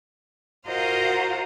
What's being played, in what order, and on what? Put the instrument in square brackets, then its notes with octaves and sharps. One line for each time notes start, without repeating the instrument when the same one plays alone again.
[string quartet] F4 F#4 A#4 C5 D#5 F5